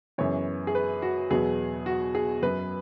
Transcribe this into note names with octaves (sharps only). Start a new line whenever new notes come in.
F#2 C#3 E3 B3 C#5
G#4
B4
F#4
E2 B2 F#3 B3 G#4
F#4
G#4
F#2 F#3 B3 B4